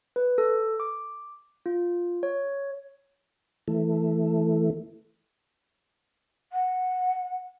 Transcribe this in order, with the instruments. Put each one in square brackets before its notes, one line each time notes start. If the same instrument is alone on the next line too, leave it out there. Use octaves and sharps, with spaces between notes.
[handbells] B4
A4
D6
F4
C#5
[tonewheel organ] E3 A3
[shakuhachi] F#5